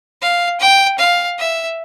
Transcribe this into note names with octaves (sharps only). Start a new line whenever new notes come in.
F5
G5
F5
E5